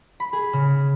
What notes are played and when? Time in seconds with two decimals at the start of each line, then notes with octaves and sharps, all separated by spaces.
0.20 B5
0.33 G#4
0.53 C#3